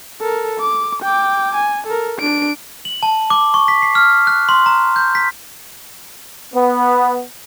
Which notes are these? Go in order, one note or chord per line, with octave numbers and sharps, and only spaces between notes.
A4 A#4
D6
G5 D6
G#5
A4 A#4
D4 D7
F#7
A5
D6
C#6
B6
C7
F6
F#6
C6
A#5
G6
B6
B3